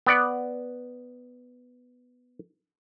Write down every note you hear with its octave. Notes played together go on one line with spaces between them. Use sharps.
B3 D5 F#5